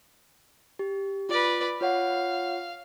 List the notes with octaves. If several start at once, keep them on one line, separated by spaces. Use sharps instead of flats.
G4
F4 B4 D5
F4 C#5 F5 F#5